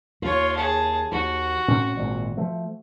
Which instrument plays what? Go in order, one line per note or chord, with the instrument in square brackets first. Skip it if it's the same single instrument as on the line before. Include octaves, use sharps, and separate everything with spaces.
[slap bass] D#2 [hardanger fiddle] F4 C#5
[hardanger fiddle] G#4 A5
[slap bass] D#2 [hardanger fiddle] F#4
[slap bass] A2 C4 C#4
G#1 A#2 C4
F3 A3